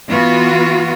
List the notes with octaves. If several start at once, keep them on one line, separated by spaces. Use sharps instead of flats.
E3 B3 F4 F#4